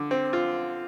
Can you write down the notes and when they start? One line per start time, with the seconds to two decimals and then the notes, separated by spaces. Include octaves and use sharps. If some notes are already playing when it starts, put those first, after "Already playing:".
Already playing: D3
0.11 C4
0.33 F4